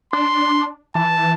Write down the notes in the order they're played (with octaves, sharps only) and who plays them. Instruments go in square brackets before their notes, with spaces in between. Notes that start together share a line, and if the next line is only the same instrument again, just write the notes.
[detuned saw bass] D4 [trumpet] C6
[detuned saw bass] E3 [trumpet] A5